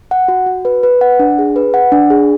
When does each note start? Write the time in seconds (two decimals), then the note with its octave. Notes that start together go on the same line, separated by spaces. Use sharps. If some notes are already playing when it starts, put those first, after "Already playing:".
0.11 F#5
0.28 F#4
0.46 F#4
0.65 B4
0.83 B4
1.01 F#5
1.19 D4
1.39 G#4
1.56 B4
1.74 F#5
1.92 D4
2.10 G#4